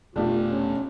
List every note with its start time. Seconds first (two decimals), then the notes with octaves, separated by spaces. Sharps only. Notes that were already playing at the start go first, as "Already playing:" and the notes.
0.16 F1 B1 A3 D4 F4 G4
0.50 C#4